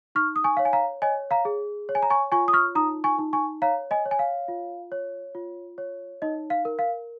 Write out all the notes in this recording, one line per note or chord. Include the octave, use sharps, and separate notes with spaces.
D#4 C#6 F6
D#6
G#5 C#6
C#5 F5
G#5
F5 A#5
C#5 D#5 G#5
F5 A#5
G#4
C#5
G#5
A#5
G#5 C#6
F4 G#5 C#6
D#6
C#6 F6
D#4 A#5 D#6
G#5 C#6
D#4
G#5 C#6
C#5 F5 A#5
D#5 G#5
C#5
G#5
F5
F4
C#5
F4
C#5
D#4 D#5
F5
A#4
F5